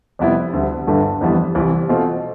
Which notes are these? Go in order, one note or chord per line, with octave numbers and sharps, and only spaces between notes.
F2 C3 G3 B3 E4
D2 D3 G3
G1 G2 D3 A3
F2 E3 G3 B3 E4
C2 C3 E3
B2 A3 C4 F4